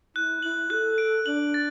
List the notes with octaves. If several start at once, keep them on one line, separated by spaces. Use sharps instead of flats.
E4 F#6
E4 F#7
A4 F#6
D7
D4 F#7
A6